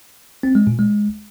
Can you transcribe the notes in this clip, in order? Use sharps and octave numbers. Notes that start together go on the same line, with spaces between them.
C4
G#3
A#2
G#3